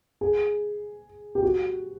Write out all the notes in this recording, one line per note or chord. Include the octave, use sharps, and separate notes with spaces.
G#4
G4
F#4